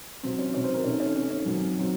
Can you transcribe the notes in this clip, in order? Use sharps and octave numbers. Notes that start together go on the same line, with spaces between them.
C3 F#3 C4
C#4
C3 F#3 C4 C#4
C5
A#4
C3 D#3 A3 C#4
C#4
C3 D#3 A3 C#4
C#4
F#2 D#3 F#3 C4
D#3 F#3 C4